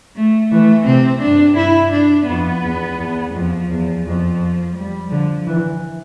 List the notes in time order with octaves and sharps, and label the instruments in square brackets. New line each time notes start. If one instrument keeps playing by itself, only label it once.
[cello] A3
[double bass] E3 [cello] A3
[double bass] C3 [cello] C4
[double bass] G2 [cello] D4
[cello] E4
D4
[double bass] F2 [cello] B3
[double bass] E2
E2
[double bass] F2 [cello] F3
[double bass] E2
[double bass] F2 [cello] F3
[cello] G3
[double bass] D3 [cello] F3
[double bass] E3